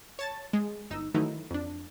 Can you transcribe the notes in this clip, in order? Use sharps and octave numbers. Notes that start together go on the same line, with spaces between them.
C#5 A5 A6
G#3
G1 D#4 E6
D#3 E3 F#3 A3 D#4 E4
F2 D4